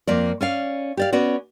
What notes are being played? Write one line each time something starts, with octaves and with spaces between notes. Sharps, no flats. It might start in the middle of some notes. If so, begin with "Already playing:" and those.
F2 A#3 D5
C#4 D5 F5
G4 D5 F5
B3 C#4 F#4 D5